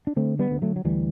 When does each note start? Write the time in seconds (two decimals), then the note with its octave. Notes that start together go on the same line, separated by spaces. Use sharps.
0.07 D4
0.16 D3 A3 C4
0.39 G3 B3
0.51 D2
0.62 F#3 A3
0.76 F#3
0.85 D2 E3 G3